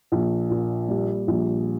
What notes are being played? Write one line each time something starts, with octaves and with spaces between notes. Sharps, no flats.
A#1
A#2
G3
A#1